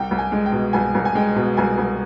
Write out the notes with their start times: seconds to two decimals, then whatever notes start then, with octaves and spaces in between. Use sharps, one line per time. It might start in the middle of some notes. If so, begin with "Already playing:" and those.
Already playing: C2 G5
0.11 C2
0.18 G#5
0.32 G#3
0.46 G5
0.52 B2
0.73 C2 G#5
0.95 C2
1.05 G#5
1.15 G#3 G5
1.36 B2
1.57 C2 G#5
1.78 C2